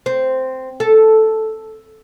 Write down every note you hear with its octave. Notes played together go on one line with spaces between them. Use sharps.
C4
A4